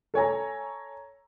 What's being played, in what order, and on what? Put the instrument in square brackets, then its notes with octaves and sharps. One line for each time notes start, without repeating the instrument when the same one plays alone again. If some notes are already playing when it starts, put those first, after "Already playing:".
[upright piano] A4 C#5 G#5 A#5